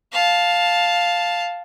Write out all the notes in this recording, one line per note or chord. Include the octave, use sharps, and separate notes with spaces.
F5 A5